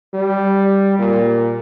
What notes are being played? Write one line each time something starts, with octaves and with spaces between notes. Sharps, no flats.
G3
A#2